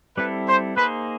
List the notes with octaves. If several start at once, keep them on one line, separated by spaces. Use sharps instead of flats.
G3 C4 E4 A4 B4
C5
A#3 D#4 G#4 B4 C5